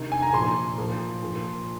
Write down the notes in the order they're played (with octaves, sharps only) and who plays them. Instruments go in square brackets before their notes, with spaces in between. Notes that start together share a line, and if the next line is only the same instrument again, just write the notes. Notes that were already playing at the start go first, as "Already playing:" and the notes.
Already playing: [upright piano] C3 D#3
G#5
A#5
A#2 F3 C6
A#2 F3
A#2 F3